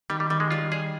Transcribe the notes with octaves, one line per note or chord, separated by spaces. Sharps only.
D#3 G3
G3
D#3 G3
G#3
G3 F4
G3 G#4